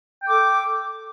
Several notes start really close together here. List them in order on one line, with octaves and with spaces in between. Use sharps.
G5 A4 D6